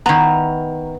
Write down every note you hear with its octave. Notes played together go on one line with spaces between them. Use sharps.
D#3 B3 E4 A#5